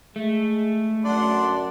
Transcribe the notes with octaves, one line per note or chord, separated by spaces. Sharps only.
G#3 A3
F#2 D4 D5 F#5 C6